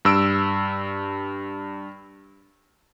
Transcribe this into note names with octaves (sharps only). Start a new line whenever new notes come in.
G2 E6 D7